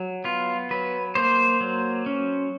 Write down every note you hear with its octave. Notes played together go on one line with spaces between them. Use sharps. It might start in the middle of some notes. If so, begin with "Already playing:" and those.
Already playing: F#3
B3 F4
F#3 B4
A#3 C5
F#3
C#4